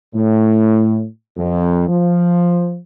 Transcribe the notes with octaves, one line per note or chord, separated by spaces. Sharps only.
A2
F2
F3